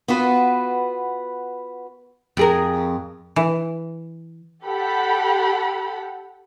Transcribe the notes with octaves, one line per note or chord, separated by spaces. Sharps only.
B3 F4 F#4 B4
F2 G#4 A#4
E3
G4 A4 F#5 B5